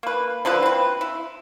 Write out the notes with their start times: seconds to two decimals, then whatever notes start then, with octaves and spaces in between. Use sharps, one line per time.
0.03 A#3 B4
0.45 D3 F3 E4 B4
0.62 C4 B4
1.01 E4